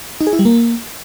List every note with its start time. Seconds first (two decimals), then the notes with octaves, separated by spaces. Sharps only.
0.21 D#4
0.27 G#4
0.33 E4
0.39 G3
0.45 A#3